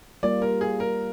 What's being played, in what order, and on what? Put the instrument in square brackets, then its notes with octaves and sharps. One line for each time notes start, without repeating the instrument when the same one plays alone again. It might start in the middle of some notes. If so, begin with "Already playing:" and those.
[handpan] G3 A#3 F4 [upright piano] D5
[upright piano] A#4
G#4
A#4